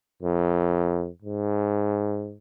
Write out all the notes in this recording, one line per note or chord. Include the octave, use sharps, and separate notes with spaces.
F2
G#2